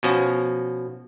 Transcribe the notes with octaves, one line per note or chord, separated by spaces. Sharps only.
B2 F3 C#4 F#4